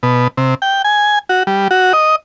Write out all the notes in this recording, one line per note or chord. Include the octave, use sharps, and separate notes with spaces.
B2
C3
G5
G#5
F#4
G3
F#4
D#5